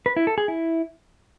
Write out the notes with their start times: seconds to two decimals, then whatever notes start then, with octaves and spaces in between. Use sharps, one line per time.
0.06 B4
0.16 E4
0.27 A4
0.38 G#4
0.48 E4